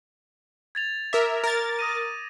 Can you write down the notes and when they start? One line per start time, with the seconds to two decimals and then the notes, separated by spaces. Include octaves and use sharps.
0.75 G#6 A6 F7
1.13 A#4 E5 D6
1.44 A#4 A6
1.79 D#6 A#6 D#7